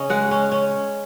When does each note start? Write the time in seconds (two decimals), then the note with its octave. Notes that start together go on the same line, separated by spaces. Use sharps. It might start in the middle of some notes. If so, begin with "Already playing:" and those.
Already playing: C#3 C#4 D#5
0.10 G#3 F#5
0.31 C#4
0.52 C#4